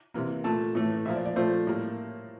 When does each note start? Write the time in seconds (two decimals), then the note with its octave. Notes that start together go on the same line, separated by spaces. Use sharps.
0.14 C3 E3 A#3
0.44 A#2 A3 A5
0.75 A2 E3 A3
1.05 A#2 F3 A#3 E5
1.15 D5
1.26 D5
1.36 A#2 F3 A3 C5
1.67 A2 G3 A#3